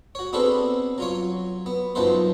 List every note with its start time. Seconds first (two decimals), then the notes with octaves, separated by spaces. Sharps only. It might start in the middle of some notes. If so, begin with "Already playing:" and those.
0.15 F#4 C#5
0.33 B3 C4 D4 G#4 A4 B4
0.98 F#3 F4 C#5
1.66 B3
1.95 B1 F#2 F3 B3 B4 C5